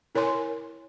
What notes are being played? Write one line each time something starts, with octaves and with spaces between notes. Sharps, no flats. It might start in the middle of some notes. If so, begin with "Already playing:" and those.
E4 A#4 C#5 G#5 C6